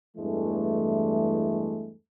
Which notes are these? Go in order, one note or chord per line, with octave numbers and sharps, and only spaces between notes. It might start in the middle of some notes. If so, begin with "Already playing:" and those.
E2 G2 E3 G#3 A3